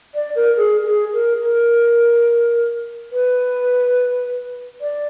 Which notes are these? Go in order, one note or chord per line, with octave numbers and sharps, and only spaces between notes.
D5
A#4
G#4
G#4
A#4
A#4
B4
D5